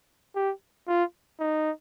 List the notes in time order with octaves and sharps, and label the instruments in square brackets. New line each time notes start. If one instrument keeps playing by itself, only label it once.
[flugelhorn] G4
F4
D#4